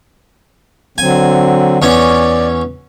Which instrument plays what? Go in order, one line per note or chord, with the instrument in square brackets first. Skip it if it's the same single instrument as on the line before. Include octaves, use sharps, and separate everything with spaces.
[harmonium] D3 F#3 C4 [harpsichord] G#5
[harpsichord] E2 C#4 [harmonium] D5